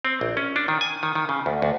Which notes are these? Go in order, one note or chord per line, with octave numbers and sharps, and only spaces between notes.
C4
A#1
C#4
D4
D#3
G#5
D#3
D#3
C#3
D2
D2